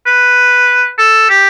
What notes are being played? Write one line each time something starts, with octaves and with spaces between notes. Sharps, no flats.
B4
A4
G4